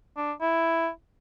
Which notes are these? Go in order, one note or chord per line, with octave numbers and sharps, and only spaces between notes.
D4
E4